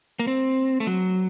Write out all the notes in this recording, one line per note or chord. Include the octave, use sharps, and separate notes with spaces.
A#3
C4
A3
F#3